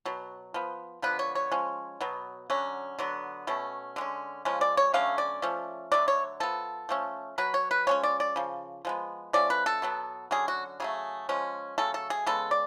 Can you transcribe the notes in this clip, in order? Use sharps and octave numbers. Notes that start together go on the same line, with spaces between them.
B2 F#3
F3 B3
D3 F3 B3 B4
C#5
C#5
F3 G#3 C#4
B2 F#3 B3
D3 F#3 C#4
D3 F#3 B3
B2 A3 C#4
D3 G#3 C#4
C#3 F3 G#3 C#4
D5
C#5
D3 F#3 A3 C#4 F5
D5
F3 A3 C#4
D3 F#3 A3 D5
C#5
F3 B3 A4
F3 A3 C#4
B2 F#3 B4
C#5
B4
F3 G#3 C#4 C#5
D5
D5
C#3 F3
F3 G#3 B3
F3 A3 C#4 D5
B4
A4
B2 F#3 B3
D3 F#3 C#4 G#4
F#4
C#3 F#3 A3 G#4
F3 G#3 C#4
C#3 F#3 A3 C#4 A4
A4
G#4
C#3 G#3 B3 A4
D5